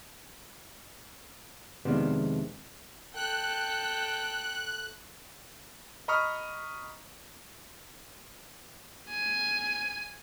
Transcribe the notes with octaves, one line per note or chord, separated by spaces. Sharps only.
F2 C3 D#3 G#3 B3 D4
A4 G5 F#6
D#5 A#5 B5 C#6 D#6 F6
G#5